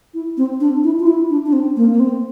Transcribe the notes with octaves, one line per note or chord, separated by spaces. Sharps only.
E4
C4
D4
E4
F4
E4
D4
D4
C4
A#3
A#3
C4